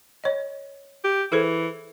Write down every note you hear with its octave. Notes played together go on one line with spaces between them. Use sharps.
C#5 D#5
G4
E3 G#4 A4 C5